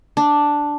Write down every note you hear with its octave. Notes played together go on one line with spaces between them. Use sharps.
D4